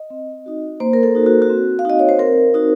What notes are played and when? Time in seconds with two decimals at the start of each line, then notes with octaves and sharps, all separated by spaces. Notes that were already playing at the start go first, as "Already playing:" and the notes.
Already playing: D#5
0.10 C4
0.46 D#4 F#4
0.80 A#3 C5
0.93 A#4
1.03 A4
1.15 D#4 F#4
1.26 F#4
1.42 F#4
1.50 C4
1.79 F5
1.85 D#4 F#4 D#5
1.99 C#5
2.09 C5
2.19 C4 A#4
2.54 D#4 F#4